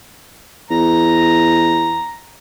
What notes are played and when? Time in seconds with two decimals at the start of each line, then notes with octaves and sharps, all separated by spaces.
0.70 E2 A#5